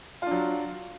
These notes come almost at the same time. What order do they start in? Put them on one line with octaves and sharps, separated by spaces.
F4 D4 F#3